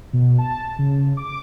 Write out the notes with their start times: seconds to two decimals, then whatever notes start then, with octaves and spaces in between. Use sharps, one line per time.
0.13 B2
0.38 A5
0.79 C#3
1.17 D6